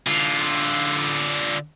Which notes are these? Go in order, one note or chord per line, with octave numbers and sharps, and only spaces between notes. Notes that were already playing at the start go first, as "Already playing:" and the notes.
D3 F4